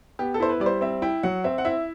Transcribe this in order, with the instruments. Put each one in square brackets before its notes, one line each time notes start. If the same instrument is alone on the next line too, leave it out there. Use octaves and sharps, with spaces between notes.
[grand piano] B3 [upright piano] G4
[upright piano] A4
[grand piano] E4 [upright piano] C5
[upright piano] B4
[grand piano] G3 [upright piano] D5
[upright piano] C5
[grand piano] C4 [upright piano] E5
[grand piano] E4 [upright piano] G5
[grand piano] F#3 [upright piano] F#5
[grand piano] C4 [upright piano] E5
[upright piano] F#5
[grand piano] E4 [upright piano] E5